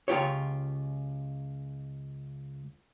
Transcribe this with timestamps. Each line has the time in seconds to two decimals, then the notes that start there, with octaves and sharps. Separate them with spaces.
0.08 C#2 F4 G4 C#5